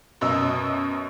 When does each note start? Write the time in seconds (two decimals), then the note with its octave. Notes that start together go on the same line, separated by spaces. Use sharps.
0.21 F#2 B2 D#5 E6